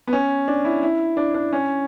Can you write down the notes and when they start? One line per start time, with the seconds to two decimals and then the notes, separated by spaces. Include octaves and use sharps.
0.07 B3
0.13 C#4
0.48 D4
0.65 E4
0.83 E4
1.17 D4
1.34 D4
1.53 C#4